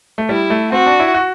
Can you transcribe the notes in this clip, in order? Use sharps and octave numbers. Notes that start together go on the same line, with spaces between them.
A3
G3 E4
A3
C4 F#4
D4
E4
F#4